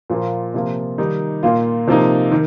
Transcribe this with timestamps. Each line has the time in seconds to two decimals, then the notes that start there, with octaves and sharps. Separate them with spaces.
0.10 A#2 F3 A#3 F4
0.54 C3 F3 A#3 F4
0.98 D#3 G3 D#4
1.43 A#2 A#3 F4
1.87 C3 F3 A#3 D#4
2.31 D#3